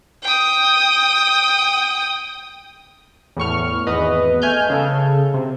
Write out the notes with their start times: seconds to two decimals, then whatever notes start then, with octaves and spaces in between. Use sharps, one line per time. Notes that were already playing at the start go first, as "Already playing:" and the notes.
0.23 G5 D#6
3.37 E2 A2 C#6 F6
3.87 G#1 E2 B4 D#5
4.42 A3 G#5 F6 G6
4.70 C#3 A4
5.34 C3